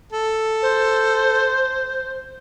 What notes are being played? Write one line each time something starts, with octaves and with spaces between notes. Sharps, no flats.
A4
C5